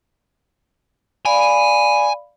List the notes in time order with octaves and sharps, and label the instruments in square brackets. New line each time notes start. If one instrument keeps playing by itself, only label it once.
[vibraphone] D5 F5 B5 [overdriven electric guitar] G#5